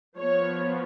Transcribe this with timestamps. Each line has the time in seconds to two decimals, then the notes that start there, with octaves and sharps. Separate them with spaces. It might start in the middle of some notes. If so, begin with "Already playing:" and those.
0.17 F3 B3 C#5